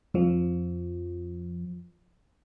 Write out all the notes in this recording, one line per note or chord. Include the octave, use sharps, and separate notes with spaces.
F2 F3